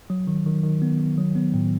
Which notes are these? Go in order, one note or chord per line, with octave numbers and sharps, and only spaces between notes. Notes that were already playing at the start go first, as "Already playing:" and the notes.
F#3
D#3
D#3
D#3
B3
D#3
F#3
B3
A2